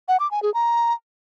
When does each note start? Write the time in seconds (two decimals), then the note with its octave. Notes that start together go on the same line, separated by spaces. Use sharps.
0.08 F#5
0.20 D6
0.31 G#5
0.43 G#4
0.54 A#5